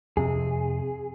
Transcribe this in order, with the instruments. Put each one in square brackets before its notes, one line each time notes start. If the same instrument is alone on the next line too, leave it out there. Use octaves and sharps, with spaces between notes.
[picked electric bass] F2 C3 [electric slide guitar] G#4